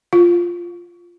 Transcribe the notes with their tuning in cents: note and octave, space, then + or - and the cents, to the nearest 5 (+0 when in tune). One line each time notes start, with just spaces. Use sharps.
F4 -5